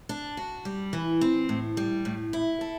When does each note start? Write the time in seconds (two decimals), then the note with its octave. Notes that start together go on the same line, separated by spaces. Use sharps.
0.09 D4
0.37 F#4
0.65 G3
0.93 E3
1.21 C4
1.49 A2
1.77 G3
2.05 A2
2.33 E4
2.61 A4